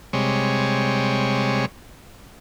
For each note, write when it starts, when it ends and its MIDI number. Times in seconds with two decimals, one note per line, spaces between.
0.13 1.66 48
0.13 1.66 55
0.13 1.66 56
0.13 1.66 73